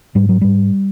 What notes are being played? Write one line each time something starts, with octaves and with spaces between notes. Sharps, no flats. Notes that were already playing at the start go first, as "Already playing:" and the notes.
G#2 G3
F#3
G#2 G3